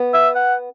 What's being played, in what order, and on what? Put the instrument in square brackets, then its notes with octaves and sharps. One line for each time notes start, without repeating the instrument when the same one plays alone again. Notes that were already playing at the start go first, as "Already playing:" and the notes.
Already playing: [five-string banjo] B3
[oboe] E5
F#5